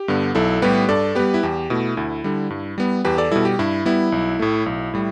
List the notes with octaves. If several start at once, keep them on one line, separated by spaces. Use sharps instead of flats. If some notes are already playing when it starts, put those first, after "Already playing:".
Already playing: G4
G2 D3 B3
B1 E4 A4
A2 G3 B3 G4 B4
G2 A4 D5
G3 B3 G4 B4
E4
E2 G4
B2 A3 E4
D2 E4
D3 G3
G2
G3 B3
E2 G4 B4
A4 D5
B2 G3 E4 A4
G4
G2 E4
G3 B3 E4
B1
A2 A3
B1
A2 G3